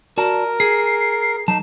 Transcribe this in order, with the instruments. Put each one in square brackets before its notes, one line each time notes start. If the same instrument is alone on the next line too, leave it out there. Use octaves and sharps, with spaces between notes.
[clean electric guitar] F#4 D5 A5 [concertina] A#4
[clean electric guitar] G#4 [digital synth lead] C7
[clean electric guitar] F#3 A5 [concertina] D#4